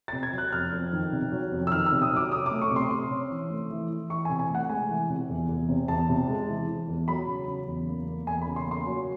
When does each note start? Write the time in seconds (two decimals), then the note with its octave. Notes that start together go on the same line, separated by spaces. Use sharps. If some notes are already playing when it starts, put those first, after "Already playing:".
0.08 A6
0.13 C3
0.23 G#6
0.32 F#3
0.38 F#6
0.52 F2 F6
0.73 F2
0.93 D#3
1.12 C3
1.32 F#3
1.52 F2
1.67 E6
1.72 D#3 F6
1.86 E6
1.92 C3
2.02 D#6
2.12 F#3 D6
2.31 C#4 D#6
2.46 D6
2.51 A3
2.62 C#6
2.71 C3
2.76 C6
2.90 C3 C6
3.10 C#4
3.31 E3
3.50 A3
3.70 E3
3.90 E3
4.10 E3 C#6
4.25 G#5
4.30 C3
4.39 G#5
4.50 A3 F#5
4.69 G#3 G#5
4.89 E3
5.10 C3
5.29 E2
5.49 E2
5.69 C3
5.88 E2 A5
6.09 C3
6.28 G#3
6.48 E3
6.68 E3
6.88 E2
7.08 F#3 B5
7.27 C#3
7.48 C#3
7.67 E2
7.87 A#3
8.07 A#3
8.27 E2 G#5
8.42 B5
8.47 C#3
8.56 C6
8.66 A#3
8.71 C6
8.86 F#3